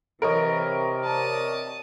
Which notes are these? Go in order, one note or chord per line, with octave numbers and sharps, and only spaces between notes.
C3 E3 A#4 C#5 D#5
D5 A5 D#6